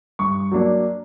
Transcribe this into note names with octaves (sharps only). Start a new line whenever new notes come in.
G2 C#6
F#3 A#3 D4